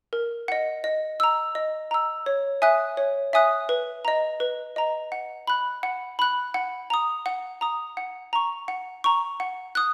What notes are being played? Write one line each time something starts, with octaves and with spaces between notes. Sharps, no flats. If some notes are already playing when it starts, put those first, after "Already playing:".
A#4
D#5 F#5
D#5
A#5 E6
D#5
A#5 E6
C#5
E5 G#5 D#6 F#6
C#5
E5 G#5 D#6 F#6
B4
D#5 A#5
B4
D#5 A#5
F#5
B5 F#6
F#5
B5 F#6
F#5
A#5 D#6
F#5
A#5 D#6
F#5
A#5 C#6
F#5
A#5 C#6
F#5
D#6 F#6